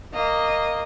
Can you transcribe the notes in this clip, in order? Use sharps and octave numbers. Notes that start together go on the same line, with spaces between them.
A#3 D#5